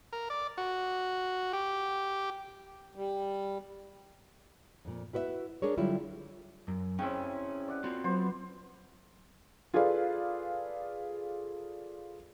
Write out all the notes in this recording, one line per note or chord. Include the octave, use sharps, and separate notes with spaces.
A#4
D5
F#4
G4
G3
F2 A#2
E4 F#4 B4 D#5 E5
D4 G#4 A#4 C#5
D3 F#3 G3 E4 F4
F#2
C#3 C4 C#4 E4 G5
D5 F#5
C4 F4 F#4
F#3 B3 C5
F4 G#4 A4 B4 D5 F5